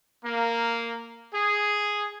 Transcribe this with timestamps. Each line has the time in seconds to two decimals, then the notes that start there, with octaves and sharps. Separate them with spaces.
0.25 A#3
1.34 G#4